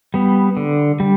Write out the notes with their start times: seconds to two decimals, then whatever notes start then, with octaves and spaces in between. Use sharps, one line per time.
0.14 G3 B3
0.57 D3
1.00 G3